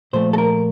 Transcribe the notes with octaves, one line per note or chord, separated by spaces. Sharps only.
A#2 F3 A3 C5
A4
A#4